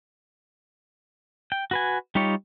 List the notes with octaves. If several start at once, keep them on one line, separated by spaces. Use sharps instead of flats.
G5
F#4 B4 G#5
G3 D#4 F4 G4 C#5